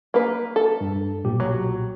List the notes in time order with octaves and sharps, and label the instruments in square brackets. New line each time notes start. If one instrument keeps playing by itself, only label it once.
[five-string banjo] A#3 B4
A4
[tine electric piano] G2
B1 A#2 G4
[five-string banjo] F#3